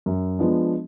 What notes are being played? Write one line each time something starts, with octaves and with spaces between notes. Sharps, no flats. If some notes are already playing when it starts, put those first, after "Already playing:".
F#2
F3 G#3 B3 D4